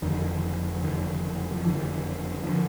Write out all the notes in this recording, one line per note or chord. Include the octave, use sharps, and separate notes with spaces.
F#1 F2 D3 D#3
F#1 F2 D3 D#3
F3
F#1 F2 D3 E3
D3 F3